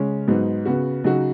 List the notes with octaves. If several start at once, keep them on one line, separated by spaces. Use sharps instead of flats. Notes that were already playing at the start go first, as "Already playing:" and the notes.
Already playing: C#3 G#3 C#4
G#2 F#3 B3 D#4
C#3 B3 F#4
C#3 F#3 D#4 F#4